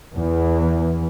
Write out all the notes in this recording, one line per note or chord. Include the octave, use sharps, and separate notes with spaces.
E2 E3